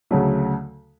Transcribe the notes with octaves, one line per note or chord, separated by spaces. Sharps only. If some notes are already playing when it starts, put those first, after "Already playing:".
D2 C#3 F#3 A3